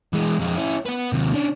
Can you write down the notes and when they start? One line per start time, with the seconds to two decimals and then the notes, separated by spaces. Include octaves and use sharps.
0.13 E3 G#3
0.40 F2 G#3
0.57 C#4 E4
0.86 B3 B4
1.12 D#2 C3
1.34 C#4 D4